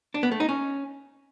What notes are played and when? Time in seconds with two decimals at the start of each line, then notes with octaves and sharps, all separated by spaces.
0.14 D4
0.23 B3
0.32 A3
0.40 D#4
0.49 C#4